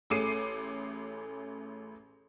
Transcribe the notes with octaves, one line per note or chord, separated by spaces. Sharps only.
A1 A3 G#4 D6 C7 D#7